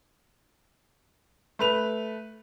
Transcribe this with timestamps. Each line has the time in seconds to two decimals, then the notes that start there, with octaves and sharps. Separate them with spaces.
1.59 A3 B4 F7